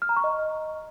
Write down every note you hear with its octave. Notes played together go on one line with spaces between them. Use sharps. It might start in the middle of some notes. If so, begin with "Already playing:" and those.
F6
A#5
C#6
D#5